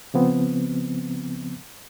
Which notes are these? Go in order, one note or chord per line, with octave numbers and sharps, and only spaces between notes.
C#3 F3 B3 C4